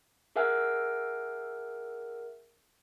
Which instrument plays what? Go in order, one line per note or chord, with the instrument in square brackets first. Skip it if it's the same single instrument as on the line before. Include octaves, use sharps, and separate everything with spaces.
[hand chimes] G#4 A#4 E5 F#5 G#5 F6